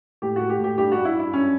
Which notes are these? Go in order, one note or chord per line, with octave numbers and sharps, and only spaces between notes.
A2 G4
A2 F#4
G4
A2
G4
G2 G4
G2 F#4
E4
G2
E4
F#2 C#4